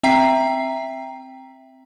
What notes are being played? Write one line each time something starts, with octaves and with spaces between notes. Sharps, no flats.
C4 E5 G5 A#5 B6 C7